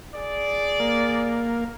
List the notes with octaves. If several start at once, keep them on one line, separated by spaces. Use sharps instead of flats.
G#4 D5
A#3